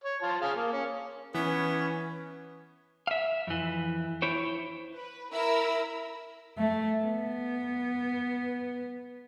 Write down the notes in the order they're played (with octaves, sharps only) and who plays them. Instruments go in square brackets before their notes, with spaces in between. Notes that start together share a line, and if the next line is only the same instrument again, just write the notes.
[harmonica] C#5
F4 A5
G#4 F5
A#3
C#4
[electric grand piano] E3 [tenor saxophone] B3 [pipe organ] C#4 [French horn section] B4
[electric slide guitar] E5 F5
F2 E3
E4 C5 C#5
[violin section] B4
E4 A#4 B5 E6
[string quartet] A3
B3